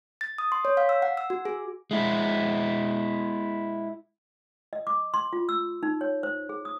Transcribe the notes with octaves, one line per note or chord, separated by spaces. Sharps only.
A6
D#6
C6
C#5
F5
E6
F#5
E6
F#4
G#4
G#3 E4
D#5
D6
C6
F4
E6
D#4
C#5
C5
G#4
D#6